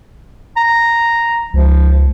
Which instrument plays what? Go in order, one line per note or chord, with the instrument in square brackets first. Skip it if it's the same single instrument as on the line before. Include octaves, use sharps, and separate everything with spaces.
[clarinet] A#5
[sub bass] C#2 [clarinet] F3